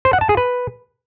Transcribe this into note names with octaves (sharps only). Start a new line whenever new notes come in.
C5
F#5
A5
G#4
B4